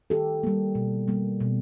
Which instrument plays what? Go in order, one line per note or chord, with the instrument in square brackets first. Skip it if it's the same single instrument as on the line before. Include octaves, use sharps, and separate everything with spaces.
[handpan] D#3 G4 A4
G3 A#3
B2
G3 A#3
B2